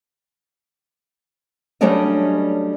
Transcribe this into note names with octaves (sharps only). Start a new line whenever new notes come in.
F#3 G3 A3 C#4 D4 D#5